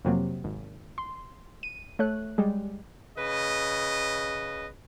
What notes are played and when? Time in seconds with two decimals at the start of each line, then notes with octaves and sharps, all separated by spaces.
0.05 F2 C3 F#3 A#3
0.44 G#1
0.98 C6
1.63 D#7
1.99 A3 C#5 F#6
2.38 G3 G#3
3.17 C#3 B4 D#5